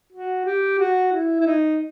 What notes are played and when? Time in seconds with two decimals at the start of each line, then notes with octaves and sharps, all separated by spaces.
0.12 F#4
0.46 G4
0.79 F#4
1.13 E4
1.41 E4
1.46 D#4